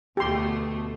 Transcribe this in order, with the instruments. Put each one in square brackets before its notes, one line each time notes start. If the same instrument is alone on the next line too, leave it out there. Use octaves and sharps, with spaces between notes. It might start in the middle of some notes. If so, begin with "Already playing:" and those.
[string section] D2 B2 A3 [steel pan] G4 C6